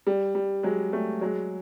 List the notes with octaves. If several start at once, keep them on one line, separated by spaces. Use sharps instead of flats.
G3
G3
F#3 G#3
G3 A3
F#3 G#3